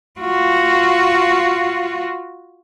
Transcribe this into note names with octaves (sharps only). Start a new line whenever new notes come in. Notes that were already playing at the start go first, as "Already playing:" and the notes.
F4 F#4